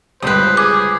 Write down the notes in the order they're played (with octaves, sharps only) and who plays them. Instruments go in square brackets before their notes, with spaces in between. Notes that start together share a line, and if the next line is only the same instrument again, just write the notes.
[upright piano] G1 C#2 G2 [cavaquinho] B4 D#6 [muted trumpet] C5
[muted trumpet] G#4 [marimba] D6